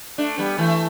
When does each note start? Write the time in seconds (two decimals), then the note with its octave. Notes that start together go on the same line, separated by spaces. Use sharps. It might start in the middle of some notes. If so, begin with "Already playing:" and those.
0.18 A3 D4
0.38 G3 B3
0.58 E3 A3